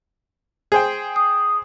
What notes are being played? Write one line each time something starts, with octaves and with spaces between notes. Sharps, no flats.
G#4 C5 G5
D#6